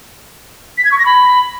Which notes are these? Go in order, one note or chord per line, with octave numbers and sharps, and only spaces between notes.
B6
G#6
C#6
A#6
B5